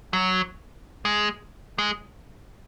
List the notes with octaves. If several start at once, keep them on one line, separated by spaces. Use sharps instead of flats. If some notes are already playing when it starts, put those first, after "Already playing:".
F#3
G#3
G#3